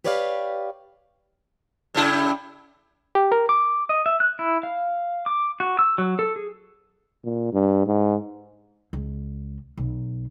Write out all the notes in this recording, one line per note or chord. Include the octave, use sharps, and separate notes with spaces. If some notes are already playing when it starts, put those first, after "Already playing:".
G4 B4 C#5 D5 E5 F5
G2 C#3 E4
G4
A#4
D6
D#5
E5
F#6
E4
F5
D6
F#4
E6
F#3
A4
G#4
A#2
G2
G#2
C#2
B1